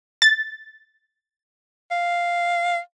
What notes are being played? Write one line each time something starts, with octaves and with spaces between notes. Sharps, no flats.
A6
F5